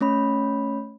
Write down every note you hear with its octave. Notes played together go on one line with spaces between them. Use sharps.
A3 C#4 C#5 B5